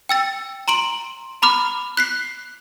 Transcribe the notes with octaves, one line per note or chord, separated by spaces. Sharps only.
G5 E6 A6
A#5 C6 D7 F#7
A#5 B5 D6 F6
F#6 B6 C7